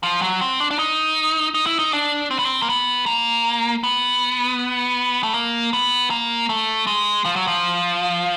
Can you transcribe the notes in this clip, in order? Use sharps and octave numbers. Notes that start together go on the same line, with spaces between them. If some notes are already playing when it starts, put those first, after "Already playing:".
F3
F#3
C4
D4
D4
D#4
D#4
E4
D#4
D4
C4
B3
C4
A#3
B3
A#3
B3
A3
A#3
B3
A#3
A3
G#3
F3
F#3
F3